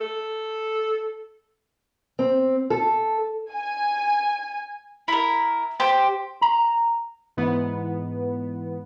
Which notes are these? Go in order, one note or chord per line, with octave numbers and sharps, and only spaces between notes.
A4
C4
A4
G#5
E4 A#4
G4 C5
A#5
G#2 E3 B3